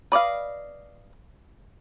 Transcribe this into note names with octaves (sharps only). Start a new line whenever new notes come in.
B4 D5 D#5 F5